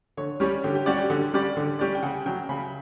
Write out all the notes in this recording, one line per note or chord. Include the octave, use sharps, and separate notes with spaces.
D3 C#5
G3 C#4 G4 C#5 D5
D3 G4
G4
G3 C#4 F#4 G4 D5
G4
D3 F#5
G3 C#4 G4 D5
D3
G3 C#4 G4 D5
G5
C#3 F#5
F#3 C#4 G5
C#3 B5